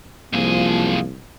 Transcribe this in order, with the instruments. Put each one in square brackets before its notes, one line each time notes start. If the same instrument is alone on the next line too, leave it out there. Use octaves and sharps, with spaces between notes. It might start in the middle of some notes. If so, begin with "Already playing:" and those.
[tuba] C2 [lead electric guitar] F#2 G#4 [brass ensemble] F3 [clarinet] A#3